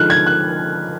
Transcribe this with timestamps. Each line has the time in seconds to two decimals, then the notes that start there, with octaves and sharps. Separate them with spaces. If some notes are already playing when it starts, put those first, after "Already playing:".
Already playing: D3 F3 G#3 D#4 F6 F#6
0.10 G#6
0.26 F#6